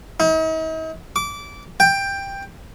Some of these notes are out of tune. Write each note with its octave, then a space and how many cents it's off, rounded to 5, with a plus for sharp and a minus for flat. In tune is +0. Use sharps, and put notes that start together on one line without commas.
D#4 +45
D6 -20
G5 +10